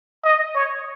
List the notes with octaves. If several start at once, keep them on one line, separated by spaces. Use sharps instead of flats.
D#5
C#5